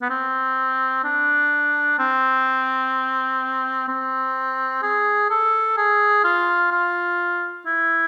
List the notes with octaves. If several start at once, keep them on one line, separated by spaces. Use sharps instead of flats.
B3
C4
D4
C4
C4
G#4
A4
G#4
F4
F4
E4